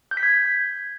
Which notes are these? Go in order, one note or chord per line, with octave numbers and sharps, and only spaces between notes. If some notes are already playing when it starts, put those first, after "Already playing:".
G6
B6
G#6